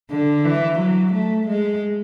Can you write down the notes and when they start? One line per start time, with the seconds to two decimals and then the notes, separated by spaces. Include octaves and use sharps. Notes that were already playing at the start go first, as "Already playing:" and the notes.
0.11 D3
0.45 E3
0.79 F#3
1.14 A3
1.48 G#3